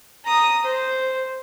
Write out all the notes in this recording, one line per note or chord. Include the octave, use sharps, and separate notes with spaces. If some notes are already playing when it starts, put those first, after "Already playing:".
A#5 D#6
C5